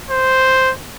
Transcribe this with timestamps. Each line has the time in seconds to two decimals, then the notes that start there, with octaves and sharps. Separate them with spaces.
0.11 C5